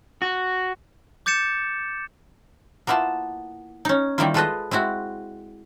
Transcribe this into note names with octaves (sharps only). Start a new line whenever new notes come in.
F#4
D6 G6 A6 C#7 E7
A#3 B3 E4 F4 A5
C#4 D#4
D#3 G3 A#3 C4 E4 F4
G#3 F4 A4 B4 C5 D#5
G#3 C4 E4 F#4